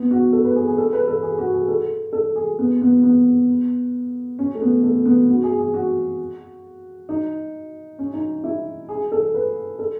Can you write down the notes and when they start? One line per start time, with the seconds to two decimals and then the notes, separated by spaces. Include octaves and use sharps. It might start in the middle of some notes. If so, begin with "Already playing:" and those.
Already playing: B3
0.11 F#4
0.33 A4
0.45 B4
0.56 G#4
0.67 G#4
0.78 A4
0.93 B4
1.08 A4
1.23 G#4
1.38 F#4
1.54 G#4
1.68 A4
2.13 A4
2.36 G#4
2.59 B3
2.81 B3
3.03 B3
4.39 C#4
4.55 A3
4.62 B3
4.83 A3
5.06 B3
5.29 F#4
5.44 G#4
5.59 G#4
5.74 F#4
7.09 D#4
7.99 C#4
8.13 D#4
8.44 E4
8.89 G#4
9.12 A4
9.34 B4
9.79 A4